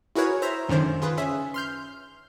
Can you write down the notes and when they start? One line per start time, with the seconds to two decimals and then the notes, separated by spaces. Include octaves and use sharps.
0.16 E4 F#4 G#4 A#4 B4 C#5
0.42 C5 E5 A#5
0.68 C#2 F#2 D3 D#3 C5
1.02 F4 G#4 B4
1.17 C#4 G#4 E5
1.54 C6 F6 G6